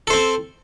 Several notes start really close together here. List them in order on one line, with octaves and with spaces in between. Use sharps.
A4 C5 C4